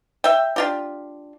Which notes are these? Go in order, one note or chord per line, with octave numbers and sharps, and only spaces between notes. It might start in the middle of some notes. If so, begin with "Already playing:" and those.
E5 G5
D4 F4 G4